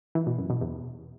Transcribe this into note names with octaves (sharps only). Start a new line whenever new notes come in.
E3
B2
F#2
B2
E2